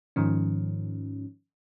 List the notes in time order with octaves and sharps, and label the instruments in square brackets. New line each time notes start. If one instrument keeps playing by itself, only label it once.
[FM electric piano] G#2 D#3 F3 C#4